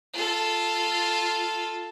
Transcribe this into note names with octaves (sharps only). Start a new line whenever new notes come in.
F4 A4